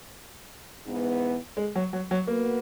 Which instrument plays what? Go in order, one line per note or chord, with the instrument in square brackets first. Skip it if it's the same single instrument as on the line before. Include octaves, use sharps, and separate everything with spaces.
[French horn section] G#2 E3 B3
[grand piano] G#3
F#3
F#3
F#3
[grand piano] A#3 [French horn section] B3 F#4 B4